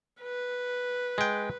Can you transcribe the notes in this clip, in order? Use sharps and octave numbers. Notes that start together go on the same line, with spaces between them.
B4
G#3 G5